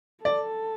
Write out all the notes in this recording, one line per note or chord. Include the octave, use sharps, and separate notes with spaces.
A4 D5